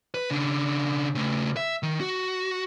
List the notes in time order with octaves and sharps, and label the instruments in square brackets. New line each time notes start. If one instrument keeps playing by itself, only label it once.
[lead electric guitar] B4
C#3 D4
C#3 A3
E5
D#3
F#4